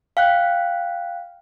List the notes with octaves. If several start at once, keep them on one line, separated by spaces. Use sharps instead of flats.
F5 G5 F#6